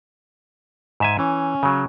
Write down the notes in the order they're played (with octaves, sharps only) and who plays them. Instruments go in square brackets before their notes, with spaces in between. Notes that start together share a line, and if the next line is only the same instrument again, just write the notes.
[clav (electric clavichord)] G#2 E5 G#5
[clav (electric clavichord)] E3 [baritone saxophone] C#4
[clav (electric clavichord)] C#3 F#3